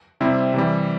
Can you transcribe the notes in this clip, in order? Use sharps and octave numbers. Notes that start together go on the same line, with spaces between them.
C3 G3 C4 E4
C3 E3 G3